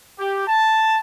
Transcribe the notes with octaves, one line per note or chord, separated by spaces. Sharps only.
G4
A5